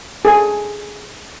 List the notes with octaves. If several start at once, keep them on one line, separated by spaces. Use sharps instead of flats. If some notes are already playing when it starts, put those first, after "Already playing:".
G#4 A4 G#5